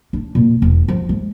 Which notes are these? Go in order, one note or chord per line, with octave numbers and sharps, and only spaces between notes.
D4
A#2
E1
F3
G#3